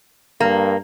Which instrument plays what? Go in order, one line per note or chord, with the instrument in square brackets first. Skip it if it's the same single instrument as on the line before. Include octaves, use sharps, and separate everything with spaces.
[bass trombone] G2 [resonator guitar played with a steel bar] A#3